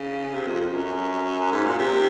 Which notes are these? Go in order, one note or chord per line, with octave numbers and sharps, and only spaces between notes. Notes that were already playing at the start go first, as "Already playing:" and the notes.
Already playing: C#3
C3
F2
F2
F#2
G#2
A#2
C3